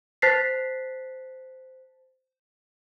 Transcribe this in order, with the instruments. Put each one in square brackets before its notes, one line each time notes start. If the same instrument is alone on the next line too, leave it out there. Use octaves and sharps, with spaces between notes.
[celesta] C5 A5 F#6 A6 B6 C7